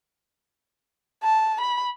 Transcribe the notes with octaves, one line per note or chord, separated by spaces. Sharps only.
A5
B5